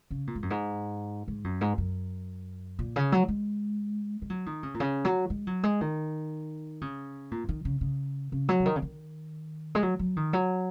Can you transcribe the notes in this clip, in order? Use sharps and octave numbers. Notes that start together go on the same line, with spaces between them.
C#3
A#2
G#2
F#2
G#2
G#2
F#2
G#2
F#2
A#2
C#3
F#3
G#3
G#3
F#3
D#3
C#3
A#2
C#3
F#3
G#3
F#3
G#3
D#3
C#3
A#2
D#3
C#3
C#3
C#3
F#3
C#3
D#3
C#3
D#3
G#3
F#3
F#3
D#3
F#3